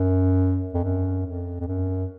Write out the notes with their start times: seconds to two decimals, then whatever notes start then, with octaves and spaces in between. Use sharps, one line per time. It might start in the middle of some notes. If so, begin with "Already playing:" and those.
Already playing: F#2
0.74 F2
0.83 F#2
1.26 F2
1.60 F2
1.67 F#2